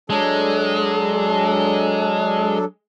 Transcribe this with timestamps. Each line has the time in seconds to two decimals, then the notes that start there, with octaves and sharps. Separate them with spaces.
0.10 F#3 G#3 D4 A4